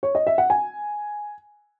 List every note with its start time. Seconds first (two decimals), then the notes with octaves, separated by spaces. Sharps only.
0.03 C#5
0.15 D#5
0.27 E5
0.38 F#5
0.50 G#5